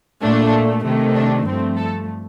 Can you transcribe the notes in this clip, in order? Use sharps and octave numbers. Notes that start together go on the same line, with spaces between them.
A#2 A3 D4
C3 D#3 A3
D4
G2 F3 A3 C4
A4